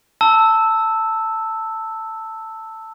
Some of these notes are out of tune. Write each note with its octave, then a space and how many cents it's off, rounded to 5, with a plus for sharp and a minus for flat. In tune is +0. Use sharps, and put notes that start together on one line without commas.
A5 +15 E6 -5